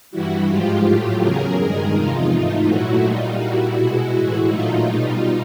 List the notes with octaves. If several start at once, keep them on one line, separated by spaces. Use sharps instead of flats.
G2 E3 G3 E4 F#4
G#2 F3 G#3 F4 G4
A2 F#3 A3
E2 C#3 F#3 G#4 A#4
G2 D#3 G#3
E2 C3 F3 G#3 D#4 F4
G#2 E3 A3
A#2 F#3 A3 E4 F#4
A#2 G3 D#4 F4
A#2 G3 E4 F#4
B2 G#3
A2 E3 G#3
A#2 F#3 A3 D#4 F4
G3
B2